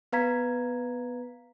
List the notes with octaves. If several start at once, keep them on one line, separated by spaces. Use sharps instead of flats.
B3 B4 F5 A#5 G#6 B6